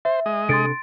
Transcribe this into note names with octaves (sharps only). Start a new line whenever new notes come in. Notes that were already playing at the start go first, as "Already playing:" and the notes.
C5 E5
G#3 D#5
C3 D4 A4 C6 A6 D7